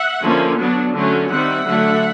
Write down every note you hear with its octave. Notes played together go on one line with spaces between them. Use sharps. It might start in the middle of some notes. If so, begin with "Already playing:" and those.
Already playing: E5 F#5
D3 F3 A#3 C#4
F#3 B3 D4
D3 F#3 A3 C#4
D#3 G3 C4 E5 F#5
D3 F#3 A3 D4